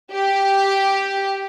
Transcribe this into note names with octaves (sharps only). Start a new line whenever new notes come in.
G4